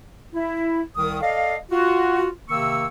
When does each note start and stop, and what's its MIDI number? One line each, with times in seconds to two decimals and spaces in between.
0.34 0.81 64
0.96 1.22 36
0.96 1.22 51
0.96 1.22 87
1.22 1.56 69
1.22 1.56 74
1.22 1.56 75
1.22 1.56 77
1.71 2.28 65
1.71 2.28 66
2.49 2.86 48
2.49 2.86 51
2.49 2.86 58
2.49 2.86 85
2.49 2.86 88